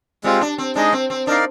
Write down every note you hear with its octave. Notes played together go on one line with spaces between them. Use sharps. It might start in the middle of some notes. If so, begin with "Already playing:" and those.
G3 G#3 C4 F4
D4
C4
G#3 D4 D#4 G#4 D#5
C4
C4
D4 D#4 A#4 D5 F5